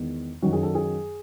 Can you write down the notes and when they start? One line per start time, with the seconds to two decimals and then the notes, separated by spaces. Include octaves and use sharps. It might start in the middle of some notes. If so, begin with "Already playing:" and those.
Already playing: E2 D#3 G#3 B3
0.42 F#2 D#3 F#3 C#4 F#4
0.53 G#4
0.63 A4
0.75 G#4